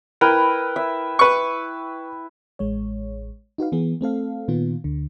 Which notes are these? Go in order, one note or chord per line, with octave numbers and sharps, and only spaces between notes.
E4 A#4 B4 G5
E5
B4 C#6
A1 G#3 C#5
D#4 F#4 B4 F5
E3 B3 G#4
A3 C4 A4 F5
A#2 D#3 B3 F4
D2 D3